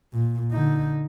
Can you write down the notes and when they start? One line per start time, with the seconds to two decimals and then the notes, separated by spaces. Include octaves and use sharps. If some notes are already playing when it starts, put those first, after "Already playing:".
0.13 A#2
0.52 D3 D#4